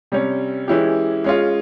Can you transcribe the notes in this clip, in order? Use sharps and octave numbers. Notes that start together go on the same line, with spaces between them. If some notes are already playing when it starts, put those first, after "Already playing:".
C3 G3 C#4
E3 G#3 C#4 E4 G4
G#3 C#4 F4